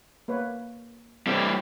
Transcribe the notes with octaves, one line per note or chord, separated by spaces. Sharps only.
A#3 B4 C#5
E3 G3 C4 A4 G5